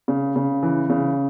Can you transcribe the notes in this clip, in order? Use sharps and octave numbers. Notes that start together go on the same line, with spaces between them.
C#3
C#3
E3
C#3